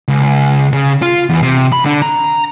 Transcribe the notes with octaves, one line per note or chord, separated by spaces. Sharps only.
C#2
C#3
F4
E2
C3
B5
D3
A#5